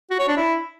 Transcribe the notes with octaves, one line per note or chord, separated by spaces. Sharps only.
F#4
C#5
D4
E4